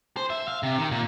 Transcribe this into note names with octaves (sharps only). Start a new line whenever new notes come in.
C5
E5
F5
C3
D#3
A#2